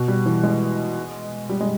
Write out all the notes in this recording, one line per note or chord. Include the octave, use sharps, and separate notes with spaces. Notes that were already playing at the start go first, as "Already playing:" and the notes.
Already playing: B2
G3
E3
G#3
G3
G#3